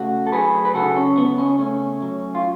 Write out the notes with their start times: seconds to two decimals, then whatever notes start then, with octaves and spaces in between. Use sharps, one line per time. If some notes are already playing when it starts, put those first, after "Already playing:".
Already playing: C#3 A3 F#4
0.27 A4
0.32 F#3 G#4 B4
0.65 B4
0.74 C#3 F#4 A4
0.96 C#4
1.17 C#3 B3
1.38 C#4
1.59 A3 C#4
2.02 F#3
2.35 F4